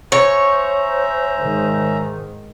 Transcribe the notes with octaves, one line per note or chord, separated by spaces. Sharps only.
C#4 C5 C#5 E5 A#5
G#2 D#3